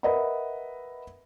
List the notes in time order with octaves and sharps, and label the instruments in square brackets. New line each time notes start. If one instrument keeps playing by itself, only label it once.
[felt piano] A#4 B4 D#5 E5 F#5 B5